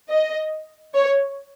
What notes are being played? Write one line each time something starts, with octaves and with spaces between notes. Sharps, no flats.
D#5
C#5